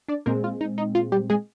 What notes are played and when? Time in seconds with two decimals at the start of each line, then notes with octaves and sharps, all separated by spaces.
0.08 D4 D5
0.26 A#2 G#3 A#3 C4 A#4
0.44 F4
0.61 D#4
0.78 D#4
0.95 F4
1.12 G3 G4
1.30 G#3 G#4